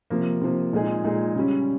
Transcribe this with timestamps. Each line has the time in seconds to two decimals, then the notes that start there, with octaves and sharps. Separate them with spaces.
0.10 C3 F3 A#3
0.41 C3 F3 A#3
0.73 A#2 G#3 D#4 G#4
1.04 A#2 G#3 D#4 G#4
1.35 C#3 G3 C#4